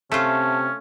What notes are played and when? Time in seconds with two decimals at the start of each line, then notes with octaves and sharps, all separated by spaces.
0.12 C3 A3 C#4 F4 A5